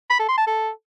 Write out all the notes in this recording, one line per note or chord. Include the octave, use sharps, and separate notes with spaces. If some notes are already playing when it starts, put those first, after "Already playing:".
B5
A4
C6
A5
A4